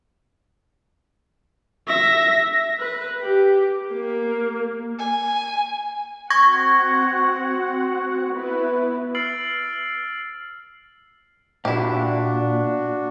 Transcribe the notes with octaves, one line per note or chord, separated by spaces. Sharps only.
E5 A#6
B4
G4
A#3
G#5
C4 F#4 F#5 C#6 G#6 A#6
B3 E4 B4
E6 F6 A6 C7 D7 F#7
A#2 D4 E4 F#4 G4